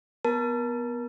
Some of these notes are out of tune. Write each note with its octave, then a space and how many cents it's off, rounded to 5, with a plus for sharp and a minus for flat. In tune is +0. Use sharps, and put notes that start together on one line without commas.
B3 +0 A#4 +30 A5 +0